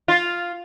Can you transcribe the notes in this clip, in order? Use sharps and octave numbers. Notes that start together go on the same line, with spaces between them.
F4